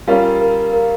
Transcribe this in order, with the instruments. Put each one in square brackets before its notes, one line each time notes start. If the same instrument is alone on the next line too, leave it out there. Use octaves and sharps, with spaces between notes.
[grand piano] G3 C#4 F4 [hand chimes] A#4
[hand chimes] A#4
A#4